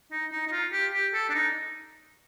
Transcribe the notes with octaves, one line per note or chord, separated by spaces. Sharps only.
D#4
D#4
D#4
F4
G4
G4
A4
D4
D#4